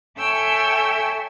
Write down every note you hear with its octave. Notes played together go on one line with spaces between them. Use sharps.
A4 C#5 E5 G5 G#5 E6